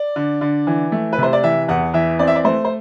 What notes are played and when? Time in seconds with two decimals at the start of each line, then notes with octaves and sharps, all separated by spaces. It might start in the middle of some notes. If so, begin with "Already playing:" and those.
Already playing: D5
0.16 D3
0.41 D3
0.67 E3
0.92 A3
1.13 B4
1.18 C3 C5
1.33 D5
1.43 E3 E5
1.68 E2 F#5
1.94 E3 E5
2.19 C4 D5
2.27 E5
2.35 D5
2.45 A3 C5
2.65 C5